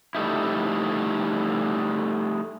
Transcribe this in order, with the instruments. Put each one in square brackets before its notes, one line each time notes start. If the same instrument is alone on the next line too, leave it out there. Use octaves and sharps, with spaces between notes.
[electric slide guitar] G3 A3 D#4 E4